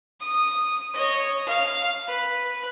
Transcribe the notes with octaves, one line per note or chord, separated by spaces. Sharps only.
D#6
C#5 D#5
F5
B4